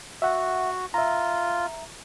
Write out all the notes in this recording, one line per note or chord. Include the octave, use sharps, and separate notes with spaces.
F#4 E5 F#5
F4 E5 A#5